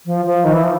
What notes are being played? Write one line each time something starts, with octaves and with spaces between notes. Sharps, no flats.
F3
F3
D#3
E3
F3